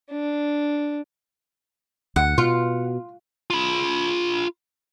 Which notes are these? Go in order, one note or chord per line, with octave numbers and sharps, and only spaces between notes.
D4
D2 F#5
B2 F4
F4 B5